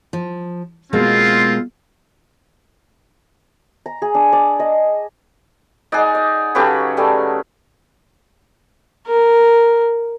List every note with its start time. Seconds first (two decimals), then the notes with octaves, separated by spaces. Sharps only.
0.13 F3
0.93 B2 G#3 A#3 C4 F4
3.86 A#5
4.02 G#4
4.15 D4
4.33 D5
4.59 D#5
5.92 D#4 G#4 D5 F#5
6.15 D5
6.55 C#3 F#3 G4 A4 B4 C#5
6.97 G3 A3 G#4
9.07 A#4